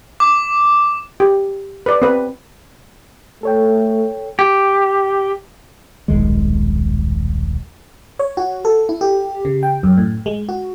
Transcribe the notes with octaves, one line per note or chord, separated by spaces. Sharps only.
D6
G4
B4 D5
C4 B4
A3 A4 C#5 G5
G4
D#1 B1 D#3 G#3
C#5
F#4
A4
E4
G4
C#3
G5
F#2
A2
G#3
F#4